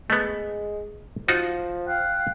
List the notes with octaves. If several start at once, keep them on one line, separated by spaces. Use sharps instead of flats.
G#3 A3 B3
F3 D#4 F4 F#4
F5 G5 F#6